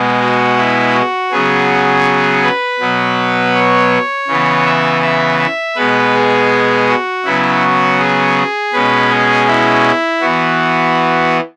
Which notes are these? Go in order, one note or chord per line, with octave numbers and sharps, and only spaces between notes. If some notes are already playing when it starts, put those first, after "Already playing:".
Already playing: B2 G#3 B3
F#4
E4
F#4
C#3 F#3 B3 G#4
B4
B2 F#3 B3
C#5
C#3 E3 B3
E5
E5
E5
B2 G#3 B3 B4
G#4
F#4
C#3 F#3 B3 E4
F#4
G#4
B2 G#3 C#4 B4
G#4
E4
E3 B3 F#4